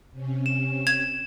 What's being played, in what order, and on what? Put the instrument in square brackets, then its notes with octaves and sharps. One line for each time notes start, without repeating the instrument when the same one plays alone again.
[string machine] C3 C#4
[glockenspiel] E7
[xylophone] G#6 [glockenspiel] E7 F7